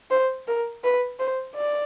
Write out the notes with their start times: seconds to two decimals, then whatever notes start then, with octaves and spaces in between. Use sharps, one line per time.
0.11 C5
0.48 A#4
0.84 B4
1.19 C5
1.56 D5